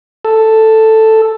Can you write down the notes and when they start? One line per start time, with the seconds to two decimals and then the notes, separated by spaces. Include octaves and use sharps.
0.25 A4